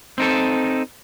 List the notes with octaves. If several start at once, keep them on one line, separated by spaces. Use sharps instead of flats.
C4 D#4 A4